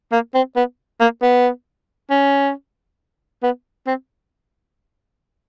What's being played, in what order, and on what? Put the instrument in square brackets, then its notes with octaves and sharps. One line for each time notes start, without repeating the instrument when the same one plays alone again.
[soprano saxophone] A#3
C4
B3
A#3
B3
C#4
B3
C4